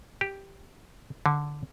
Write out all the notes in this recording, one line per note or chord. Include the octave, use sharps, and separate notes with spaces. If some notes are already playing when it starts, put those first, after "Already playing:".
G4
D3